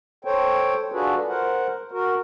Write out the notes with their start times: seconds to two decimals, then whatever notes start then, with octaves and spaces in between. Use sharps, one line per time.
0.25 A4 C5 C#5 G5
0.92 D4 F4 F#4 G#4 A4 B4
1.28 A#4 C5 F#5
1.91 F#4 A#4